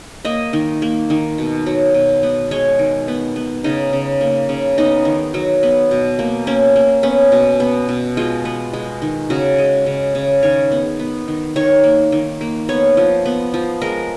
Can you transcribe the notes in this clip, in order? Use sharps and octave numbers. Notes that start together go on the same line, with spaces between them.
A#3 D#5
D#3
A#3
D#3
B2
F#3
B2
B3
G#3 C#5
D#3
B3
B3
C#3 D#4
C#3
A#3
C#3
B3 D#4
D#3
F#3
B3
B2
A#3
A#3 C#4
A#3
B3 C#4
B2
B3
B2
G#3 F4
B3
G#3
D#3
C#3 F#4
G#3
C#3
C#3
D#3 C#5
B3
B3
D#3
D#3 C#5
A#3
D#3
A#3
B3 C#5
F3
B3
F3
G#3 A#4